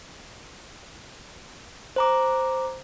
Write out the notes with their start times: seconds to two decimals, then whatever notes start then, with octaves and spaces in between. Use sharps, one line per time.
1.96 C5 A#5 D6